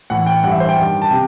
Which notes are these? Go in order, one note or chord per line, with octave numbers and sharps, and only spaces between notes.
A2 E3 F#5
G5
G2 E3 E5 F#5
C5
G5
G2 D#3
A5
C3 G5